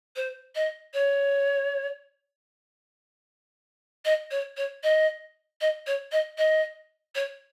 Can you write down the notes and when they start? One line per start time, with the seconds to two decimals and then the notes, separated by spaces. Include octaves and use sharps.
0.16 C5
0.55 D#5
0.94 C#5
4.05 D#5
4.31 C#5
4.57 C#5
4.83 D#5
5.61 D#5
5.87 C#5
6.12 D#5
6.38 D#5
7.15 C#5